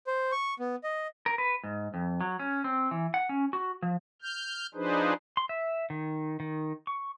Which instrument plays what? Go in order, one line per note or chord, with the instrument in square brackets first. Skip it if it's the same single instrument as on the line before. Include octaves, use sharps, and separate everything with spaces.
[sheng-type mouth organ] C5
C#6
B3
D#5
[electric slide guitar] A#4
B4
G#2
F2
F#3
C#4
C4
E3
F#5
C#4
F#4
F3
[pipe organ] F6 G6
F3 D4 D#4 G#4 B4 C5
[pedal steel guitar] C6
E5
D#3
D#3
C#6